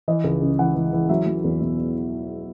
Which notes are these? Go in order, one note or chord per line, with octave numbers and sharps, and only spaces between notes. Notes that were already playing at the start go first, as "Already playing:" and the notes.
E3 D#5
C#2
C#3
E3 F#5
E3
E3
F#3 E5
F#3
E2
B2